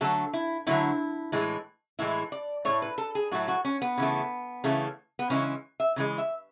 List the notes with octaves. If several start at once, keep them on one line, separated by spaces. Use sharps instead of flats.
D3 F#3 A3 A4
E4
D3 F#3 A3 E4
A2 E3 G#3
A2 E3 G#3 E4
D5
A2 F#3 A3 C#5
B4
A4
G#4
A2 F#3 A3 F#4
F#4
C#4
B3
C#3 E3 A3
C#3 E3 A3
B3
C#3 E3 G#3 C#4
E5
C#3 E3 G#3
E5